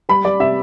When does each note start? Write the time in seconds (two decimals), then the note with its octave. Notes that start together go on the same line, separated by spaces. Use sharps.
0.09 G3 B5
0.25 G3 D5
0.40 C3 E5